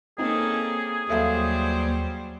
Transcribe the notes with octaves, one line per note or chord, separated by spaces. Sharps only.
A#3 C4 C#4 D#4 G#4 A4
D#2 F#3 G3 A4 C5 E5 F5